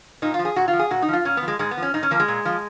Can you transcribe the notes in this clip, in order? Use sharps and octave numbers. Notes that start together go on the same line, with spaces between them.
A#2 D#4
F4
F3
G#4
A#2 F#4
F4
F3
G#4
A#2 F#4
D#4
F3 F4
A#2 C#4
B3
F3
G#3
G#2 G#3
B3
F3
C#4
G#2 D#4
C#4
F3 A#3
G#3
A#2
F3